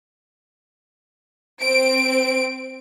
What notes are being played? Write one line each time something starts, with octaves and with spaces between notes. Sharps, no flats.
C4 D7